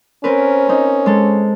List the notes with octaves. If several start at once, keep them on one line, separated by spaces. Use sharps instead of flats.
C4 C#4 A#4 B4
C4 D#4
G#3 A4